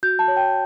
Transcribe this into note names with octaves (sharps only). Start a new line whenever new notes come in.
F#4 G6
A5
C#5
G5